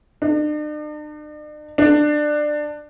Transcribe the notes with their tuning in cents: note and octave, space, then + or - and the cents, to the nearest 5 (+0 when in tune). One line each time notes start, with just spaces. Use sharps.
D4 +45
D4 +20